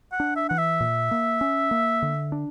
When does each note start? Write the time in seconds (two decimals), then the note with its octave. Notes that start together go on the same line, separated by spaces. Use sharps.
0.12 F#5
0.20 D4
0.36 E5
0.49 E3 F#5
0.58 E5
0.80 A#2
1.11 A#3
1.41 C#4
1.71 A#3
2.02 D3
2.32 D4